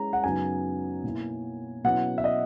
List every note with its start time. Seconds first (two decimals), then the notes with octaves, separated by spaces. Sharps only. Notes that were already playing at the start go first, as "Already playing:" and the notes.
Already playing: G#3 C#4 E4 A#5
0.13 F#5
0.24 F#2 C#3 F#3 B3 D#4 G#5
1.04 B2 A#3 E4
1.84 B2 F#3 C#4 E4 F#5
2.18 E5
2.24 D#5